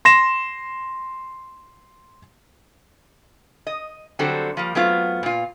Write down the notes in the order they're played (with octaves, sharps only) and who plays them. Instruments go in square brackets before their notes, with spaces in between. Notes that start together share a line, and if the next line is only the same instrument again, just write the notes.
[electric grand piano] C6 A#6 E7
[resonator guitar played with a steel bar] D#5
D3 F#3 G3 C4 F#4 A4
F3 G3 A#3
F#3 A3 B3 C4 F4
A#2 F4